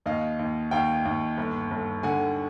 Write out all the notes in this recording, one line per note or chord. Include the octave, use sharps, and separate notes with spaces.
D#2 D#5 F5
D#2
D#2 F5 G5
D#2
G1
G1
D3 F#5 G#5